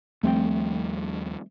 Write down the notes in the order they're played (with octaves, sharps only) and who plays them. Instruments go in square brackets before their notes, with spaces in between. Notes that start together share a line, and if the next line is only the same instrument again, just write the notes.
[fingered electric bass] D#2 F3 G3 [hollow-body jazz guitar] A3 C4 G5